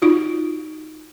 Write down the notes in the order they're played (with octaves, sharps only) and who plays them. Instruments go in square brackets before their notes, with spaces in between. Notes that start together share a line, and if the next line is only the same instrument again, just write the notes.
[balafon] D#4 F4 F#4